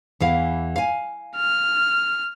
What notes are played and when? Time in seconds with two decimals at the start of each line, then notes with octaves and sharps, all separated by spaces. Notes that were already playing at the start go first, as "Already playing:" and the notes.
0.20 E2 E3 F5
0.76 F5 G#5
1.37 F6